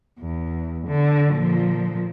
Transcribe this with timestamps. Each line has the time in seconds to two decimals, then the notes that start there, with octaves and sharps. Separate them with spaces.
0.20 E2
0.87 D3
1.32 A#2 F3